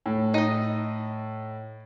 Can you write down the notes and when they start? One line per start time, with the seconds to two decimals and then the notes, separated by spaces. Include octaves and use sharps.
0.06 A2
0.34 D#4 D#5